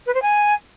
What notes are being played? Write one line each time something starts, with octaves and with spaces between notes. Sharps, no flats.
B4
C5
G#5